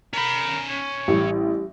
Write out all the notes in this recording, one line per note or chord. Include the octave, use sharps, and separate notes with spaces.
C#4 A#4 B5
C#5
A1 G3 G4